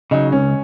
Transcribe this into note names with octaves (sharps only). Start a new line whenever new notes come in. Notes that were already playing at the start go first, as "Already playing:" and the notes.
C#3 F#3 D#4
C#2 C#4